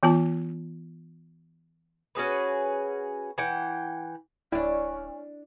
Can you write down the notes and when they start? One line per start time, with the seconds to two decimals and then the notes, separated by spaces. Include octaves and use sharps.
0.03 E3 B3 F4 A5
2.15 C#4 F#4 G#4 B4
3.38 E3 F#5 G5
4.52 D1 C#4 D4 E4 D5